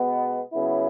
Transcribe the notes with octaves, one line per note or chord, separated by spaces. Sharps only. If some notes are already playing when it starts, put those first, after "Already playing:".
Already playing: B2 G#3 B3
C#3 F#3 B3 E4